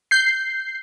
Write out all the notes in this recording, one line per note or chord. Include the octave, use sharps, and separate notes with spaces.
G6 C7